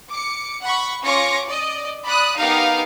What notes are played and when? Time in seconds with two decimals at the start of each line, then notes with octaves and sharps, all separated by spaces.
0.10 D6 C#7
0.62 F#5 B5 C#6
1.02 C#4 F4 C#6 D6 A#6 C#7
1.46 D5 D#5
2.04 D5 B5 D#6 F#6
2.38 B3 D#4 G4 A#4 F5